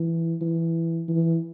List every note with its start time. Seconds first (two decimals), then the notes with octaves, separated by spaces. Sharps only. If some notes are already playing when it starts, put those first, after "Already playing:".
Already playing: E3
0.41 E3
1.08 E3